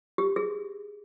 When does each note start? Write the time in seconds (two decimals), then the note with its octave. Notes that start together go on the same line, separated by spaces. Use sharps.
0.18 G4
0.36 G#4